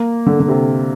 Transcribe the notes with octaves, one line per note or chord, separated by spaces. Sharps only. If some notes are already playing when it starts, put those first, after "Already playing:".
Already playing: A#3
D3
D3
C3